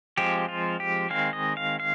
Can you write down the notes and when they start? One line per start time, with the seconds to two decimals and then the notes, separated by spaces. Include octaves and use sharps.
0.17 F3 G#3 C4 G4
0.49 F4
0.80 G4
1.10 D#3 G#3 C4 F5
1.33 D#5
1.57 F5
1.80 F5